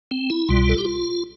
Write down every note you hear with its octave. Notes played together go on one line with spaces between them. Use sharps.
C4
E4
C2 B2 G3 F4
A4
G4
F4